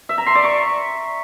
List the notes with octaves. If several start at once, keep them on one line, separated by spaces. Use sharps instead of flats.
E5
A#5
C6
D5
C#6